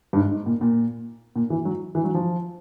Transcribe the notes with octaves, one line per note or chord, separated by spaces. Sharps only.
G2
G#2
G#2
A#2
A#2
A#2
E3
F#3
E3
F#3
F3